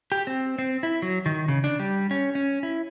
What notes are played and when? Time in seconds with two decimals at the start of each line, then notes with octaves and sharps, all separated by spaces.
0.12 G4
0.27 C4
0.59 C4
0.83 E4
1.02 F#3
1.26 D#3
1.48 C#3
1.64 D4
1.80 G3
2.11 C#4
2.35 C#4
2.63 E4